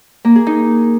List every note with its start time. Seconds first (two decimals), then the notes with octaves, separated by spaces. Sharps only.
0.25 A#3
0.36 G#4
0.47 D#4